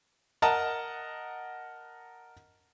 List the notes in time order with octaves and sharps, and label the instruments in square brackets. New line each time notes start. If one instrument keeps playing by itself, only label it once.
[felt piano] A#4 D#5 F#5 A5 A#5